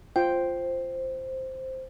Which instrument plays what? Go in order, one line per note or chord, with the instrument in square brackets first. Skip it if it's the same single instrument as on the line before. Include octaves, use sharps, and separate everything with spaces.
[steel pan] F4 G5 [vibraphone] C5